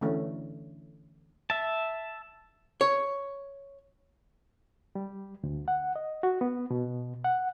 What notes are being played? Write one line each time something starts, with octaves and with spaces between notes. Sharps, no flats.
D3 E3 A3 C#4
E5 A5
C#5
G3
D2
F#5
D#5
F#4
B3
B2
F#5